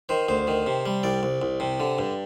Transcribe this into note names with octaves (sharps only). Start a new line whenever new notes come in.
D#3 C5
D2 C5
D#3
C3
G3
C2 D5
C2
C2
C3
D3
G2